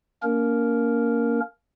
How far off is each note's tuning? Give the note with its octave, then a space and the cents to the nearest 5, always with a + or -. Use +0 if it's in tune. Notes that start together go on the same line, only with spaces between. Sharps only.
A#3 +0 C#4 +45 A#4 +0